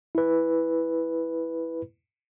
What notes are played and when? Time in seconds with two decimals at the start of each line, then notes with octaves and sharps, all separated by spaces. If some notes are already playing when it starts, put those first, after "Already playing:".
0.15 E4 B4